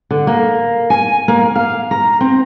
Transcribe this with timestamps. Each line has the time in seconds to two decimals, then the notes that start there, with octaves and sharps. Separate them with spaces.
0.11 D3
0.27 A#3
0.90 G#5
1.28 A#3
1.55 F5
1.91 A#5
2.21 C4